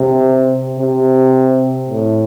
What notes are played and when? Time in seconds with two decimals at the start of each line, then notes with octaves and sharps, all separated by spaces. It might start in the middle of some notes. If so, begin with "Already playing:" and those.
Already playing: C3
0.79 C3
1.89 A2